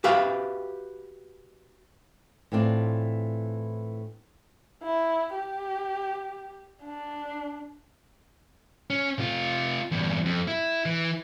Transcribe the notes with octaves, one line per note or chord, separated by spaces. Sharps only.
F#4 G4 B4 E5 F5
A2 E3 C4 D4 F4
E4
G4
D4
C#4
C3 F4
E2 G2
F2
E4
E3